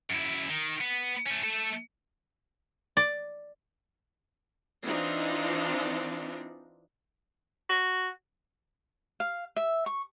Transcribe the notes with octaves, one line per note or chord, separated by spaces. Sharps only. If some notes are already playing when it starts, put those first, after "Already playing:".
F#2 E4
D#3
B3
A3 C#4
A3 A4
D5
E3 C4 D4 D#4 F4
F#4
F5
E5
C#6